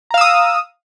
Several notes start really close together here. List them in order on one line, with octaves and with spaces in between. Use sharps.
A#5 F5 E6 D#6